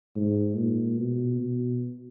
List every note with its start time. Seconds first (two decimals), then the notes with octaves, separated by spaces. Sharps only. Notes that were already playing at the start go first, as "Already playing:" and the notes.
0.16 G#2
0.57 A#2
0.98 B2
1.40 B2